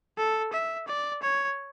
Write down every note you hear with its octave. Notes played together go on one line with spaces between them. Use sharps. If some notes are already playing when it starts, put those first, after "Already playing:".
A4
E5
D5
C#5